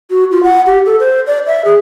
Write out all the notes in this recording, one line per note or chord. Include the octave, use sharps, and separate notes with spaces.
F#4
F4
F#5
G4
A4
C5
D5
E5
G#4